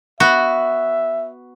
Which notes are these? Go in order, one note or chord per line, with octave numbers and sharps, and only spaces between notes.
B3 F#4 E5